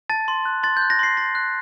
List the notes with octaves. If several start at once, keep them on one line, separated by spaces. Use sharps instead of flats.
A5 A6
C6
F#6
C6 A6
G6
F#6
A#6
C6 C7
C6 A#6
F#6